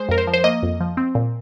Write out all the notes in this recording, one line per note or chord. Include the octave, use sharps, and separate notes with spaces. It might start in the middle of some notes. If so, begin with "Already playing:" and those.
Already playing: G#3 C5
F2 A#4
C5
F3
C5
A#3 D#5
F2
F3
C4
A#2